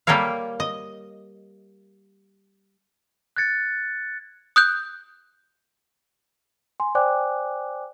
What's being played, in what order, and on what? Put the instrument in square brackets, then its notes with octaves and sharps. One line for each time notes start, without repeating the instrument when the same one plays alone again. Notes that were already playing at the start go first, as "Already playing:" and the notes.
[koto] G3 A#3 A4 A#4 C#5 F5
D#5
[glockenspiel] F#6 G#6 A6 C#7
[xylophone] D#6 F#6 G6
[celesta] G#5 C6
C5 D5 G5 G#5 D6 F#6